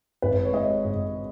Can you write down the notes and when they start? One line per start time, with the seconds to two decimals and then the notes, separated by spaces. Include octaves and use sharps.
0.22 G#1 B4
0.45 C#5
0.53 G#3 D#5
0.85 G#2